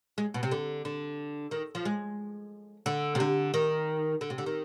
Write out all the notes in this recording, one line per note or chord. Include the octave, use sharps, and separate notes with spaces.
G#3
B2
C3
D3
D3
D#3
F3
G#3
D3
C3
D3
D#3
D3
C3
D3
D#3